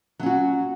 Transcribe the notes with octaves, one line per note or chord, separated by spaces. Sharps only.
F#3 C#4 F#4